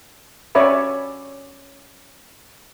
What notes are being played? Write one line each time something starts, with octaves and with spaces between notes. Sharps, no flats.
C#4 C#5 D5 E5 B5